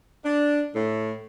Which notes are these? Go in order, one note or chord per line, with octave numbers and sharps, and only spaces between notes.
D4
A2